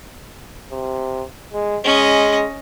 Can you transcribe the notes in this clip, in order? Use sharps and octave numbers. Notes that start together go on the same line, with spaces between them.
C3
G#3
G#3 C#4 D#5